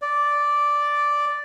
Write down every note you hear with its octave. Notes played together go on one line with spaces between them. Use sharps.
D5